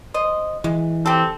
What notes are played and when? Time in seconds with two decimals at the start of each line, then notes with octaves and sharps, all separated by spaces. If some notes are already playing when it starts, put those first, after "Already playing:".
0.14 C5 D#5
0.64 E3 G#3
1.06 C4 G4 A4